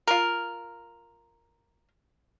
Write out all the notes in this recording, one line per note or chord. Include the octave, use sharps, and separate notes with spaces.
F4 A#4